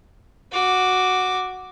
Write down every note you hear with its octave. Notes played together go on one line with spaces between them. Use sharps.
F#4 D6